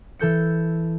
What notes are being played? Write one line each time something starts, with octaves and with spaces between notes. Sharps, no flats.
E3 A4 G6 C#7